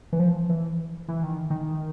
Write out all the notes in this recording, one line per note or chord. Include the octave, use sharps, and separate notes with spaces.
E3
F3
E3
E3
D#3
D#3